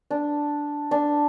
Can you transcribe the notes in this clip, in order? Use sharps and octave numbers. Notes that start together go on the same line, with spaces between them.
D4
D4